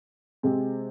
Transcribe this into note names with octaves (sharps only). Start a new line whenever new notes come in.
C3 G#3 C4